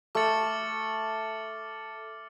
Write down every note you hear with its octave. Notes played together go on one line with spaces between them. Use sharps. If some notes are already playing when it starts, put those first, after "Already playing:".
A3 D6 F6 A6 C#7 F#7